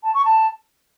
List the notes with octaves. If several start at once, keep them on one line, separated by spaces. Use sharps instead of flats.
A5
C#6
A5